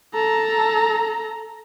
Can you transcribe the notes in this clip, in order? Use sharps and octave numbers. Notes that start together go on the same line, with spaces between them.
A4 A#5